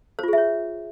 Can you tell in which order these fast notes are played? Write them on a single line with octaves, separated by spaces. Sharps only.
C5 F4 G#4 E5 C#5